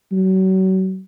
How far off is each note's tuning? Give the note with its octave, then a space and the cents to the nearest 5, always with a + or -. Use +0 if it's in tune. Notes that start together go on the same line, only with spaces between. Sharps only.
F#3 +35